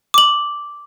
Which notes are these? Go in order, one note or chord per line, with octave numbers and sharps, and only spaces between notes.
D6 F#7